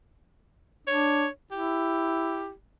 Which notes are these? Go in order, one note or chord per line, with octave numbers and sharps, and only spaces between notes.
D4 C#5
E4 G4